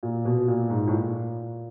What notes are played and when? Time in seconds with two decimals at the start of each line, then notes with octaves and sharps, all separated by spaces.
0.03 A#2
0.25 B2
0.48 A#2
0.70 G#2
0.87 A2
0.92 A#2